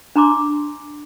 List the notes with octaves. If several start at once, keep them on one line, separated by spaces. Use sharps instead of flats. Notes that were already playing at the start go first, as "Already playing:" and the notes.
D4 A#5 C6 D6